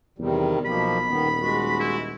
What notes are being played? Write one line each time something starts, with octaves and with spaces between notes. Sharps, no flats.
E2 C3 D#3 G3
B1 B2 F3 A#3 B5
D#1 D#3 B3
G#3 F#4
E4